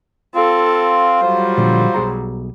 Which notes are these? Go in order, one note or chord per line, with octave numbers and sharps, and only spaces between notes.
C4 F4 A4
F#3 G3 C5
A#2 D3 F3
B1 G#4 A#5